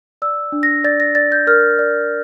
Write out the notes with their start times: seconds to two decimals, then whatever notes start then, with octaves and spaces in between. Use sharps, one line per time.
0.22 D5 E6
0.52 D4
0.63 A#6
0.84 D5 A6
1.00 A#6
1.15 D5 A6
1.32 G6
1.47 A#4 F6
1.79 D5